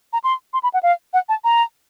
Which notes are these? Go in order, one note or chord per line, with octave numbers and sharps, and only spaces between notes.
A#5
C6
C6
B5
F#5
F5
F#5
A5
A#5